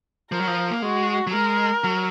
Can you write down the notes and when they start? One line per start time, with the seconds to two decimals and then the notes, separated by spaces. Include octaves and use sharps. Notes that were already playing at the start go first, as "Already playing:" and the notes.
0.31 F3 A#4
0.39 F#3
0.47 F3
0.71 A#3
0.82 G#3 F#4
1.27 F#3
1.33 G#3 A#4
1.84 F#3